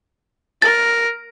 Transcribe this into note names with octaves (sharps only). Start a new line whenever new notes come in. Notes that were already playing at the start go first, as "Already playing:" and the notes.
A#4 A6